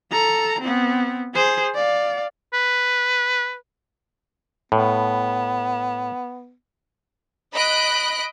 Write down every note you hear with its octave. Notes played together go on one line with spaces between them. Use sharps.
A4 A#5
B3 C4
G#4 C5
D5 F5
B4
A2 B3
D#5 B5 F#6 D7